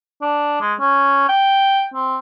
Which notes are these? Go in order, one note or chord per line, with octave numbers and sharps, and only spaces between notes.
D4
G#3
C#4
G5
C4